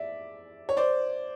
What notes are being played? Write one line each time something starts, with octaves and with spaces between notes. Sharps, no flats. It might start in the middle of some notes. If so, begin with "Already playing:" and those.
Already playing: D5 E5
C#5
C5 D5